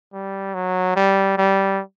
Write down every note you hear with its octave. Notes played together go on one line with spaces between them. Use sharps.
G3
F#3
G3
G3